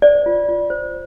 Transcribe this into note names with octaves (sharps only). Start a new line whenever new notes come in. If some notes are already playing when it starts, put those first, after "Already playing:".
C5 D5
F4
F4
C5